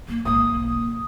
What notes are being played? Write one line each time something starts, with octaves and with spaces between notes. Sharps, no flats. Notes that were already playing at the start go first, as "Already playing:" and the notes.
F#2 A#3
A1 G#2 A#3 D#6
B1
C#4